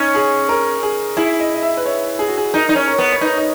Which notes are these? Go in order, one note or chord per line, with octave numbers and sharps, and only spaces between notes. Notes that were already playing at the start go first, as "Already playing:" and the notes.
Already playing: C#4 D#4
G#4
A#4
G#4
E4 G#4
D#5
D#5
E5
B4
C#5
G#4
F#4
G#4
D#4 A#4
D#4
C#4
A#4
B3
C#5
D#4 B4
D#5